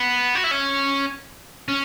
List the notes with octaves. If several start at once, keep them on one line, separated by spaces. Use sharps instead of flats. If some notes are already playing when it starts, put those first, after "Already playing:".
Already playing: B3
F#4
E4
C#4
C#4